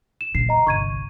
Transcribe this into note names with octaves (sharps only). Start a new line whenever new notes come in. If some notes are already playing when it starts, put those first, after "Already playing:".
E7
E2 A#2 C7
D#5 A#5
G1 C2 C#6 G#6 D#7